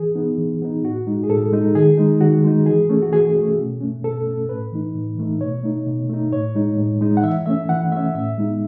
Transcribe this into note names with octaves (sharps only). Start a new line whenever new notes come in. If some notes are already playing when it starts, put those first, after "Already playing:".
Already playing: E3 G#4
B3 D#4
E3
B3 D#4
A2 F#4
G#3 D#4
G#4
A2 A4
G#3 D#4
D#3 G#4
G#3 D#4
D#3 F#4
G#3 D#4
E3 G#4
A3 C#4
F#4
E3 G#4
A3 C#4
B2
A3 C#4
B2 A4
A3 C#4
A2 B4
E3 A3 D#4
A2
E3 A3 D#4
B2 C#5
A3 D#4
B2
A3 D#4
A2 C#5
G#3 D#4
A2
G#3 D#4
F#5
E3 E5
A3 C#4 E5
E3 F#5
A3 C#4 E5
A2 E5
G#3 B3 D#4